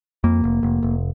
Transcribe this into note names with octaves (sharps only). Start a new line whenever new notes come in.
F2 A#3
F1
F1
F1